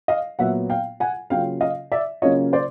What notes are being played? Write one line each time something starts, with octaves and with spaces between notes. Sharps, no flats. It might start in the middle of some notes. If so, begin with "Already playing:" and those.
D#5 F5
A#2 F#3 B3 E5 F#5
F5 G5
F#5 G#5
C#3 F#3 A#3 C#4 F4 F5 G5
D#5 F5
D5 E5
C#3 F#3 A#3 C#4 F4 C#5 D#5
C5 D5